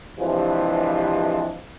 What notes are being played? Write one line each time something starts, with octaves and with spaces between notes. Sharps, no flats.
G2 C3 E3 F3 G#3 C5